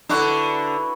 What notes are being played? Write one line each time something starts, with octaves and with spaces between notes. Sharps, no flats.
D3 D4 E4 F#4 B4